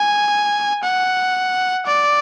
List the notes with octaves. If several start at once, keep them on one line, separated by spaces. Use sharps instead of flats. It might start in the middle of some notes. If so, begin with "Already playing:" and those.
Already playing: G#5
F#5
D5